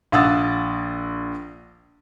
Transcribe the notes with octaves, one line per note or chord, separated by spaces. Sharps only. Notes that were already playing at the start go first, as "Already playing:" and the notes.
A#1 F5 F#5 D#6 E6 A6